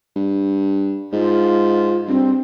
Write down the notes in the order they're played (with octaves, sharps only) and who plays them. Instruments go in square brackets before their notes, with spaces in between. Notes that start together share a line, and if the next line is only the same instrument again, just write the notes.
[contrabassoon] G2
[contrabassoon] G#2 [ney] F4
[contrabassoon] G2 [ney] C4